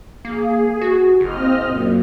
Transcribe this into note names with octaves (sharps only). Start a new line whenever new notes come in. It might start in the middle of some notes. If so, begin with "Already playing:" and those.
A#3 G#4
F#4
F#1 C4 D#5 F6
F#2 A#2